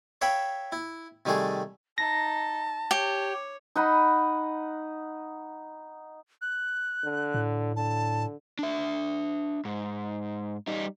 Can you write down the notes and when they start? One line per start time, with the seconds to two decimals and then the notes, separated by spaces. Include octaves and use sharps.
0.21 C#5 E5 F5 G5 B5
0.72 E4
1.26 C3 D#3 G3 A3 G#4
1.98 D#4 A5 A#6
2.91 G4 C#5
3.76 D#4 D#5 F#5 B5
6.42 F#6
7.05 D3
7.34 A2
7.76 D3 A5
8.59 D4 E5
9.65 G#2
10.67 G3 D#4